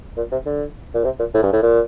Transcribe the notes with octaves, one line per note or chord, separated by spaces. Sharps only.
A#2
C3
D3
A#2
C3
A#2
A2
G2
A2
A#2